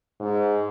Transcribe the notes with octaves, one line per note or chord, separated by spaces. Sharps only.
G#2